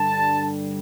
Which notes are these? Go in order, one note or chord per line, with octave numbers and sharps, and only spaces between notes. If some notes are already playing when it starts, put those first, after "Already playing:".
Already playing: G2 D3 G3 A5